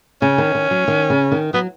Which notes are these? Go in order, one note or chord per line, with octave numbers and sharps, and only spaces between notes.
C#3 C#4
D#3
D#3
F#3
D#3
C#3
D#3
F#3 B3